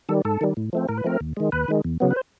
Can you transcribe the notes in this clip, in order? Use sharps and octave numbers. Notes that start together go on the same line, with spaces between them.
D#3 G3 A4
G#2 A4
D#3 G3
A2
F3 A3 C4
A2 A#4
B4
F3 A3 C4 A#4
D#2
D#3 G#3
D#2 B4
D#3 G#3
E2
C#3 F#3 B3
B4
C5